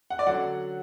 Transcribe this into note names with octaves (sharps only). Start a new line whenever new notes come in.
F#5
D5
D3 F#3 C#4 F#5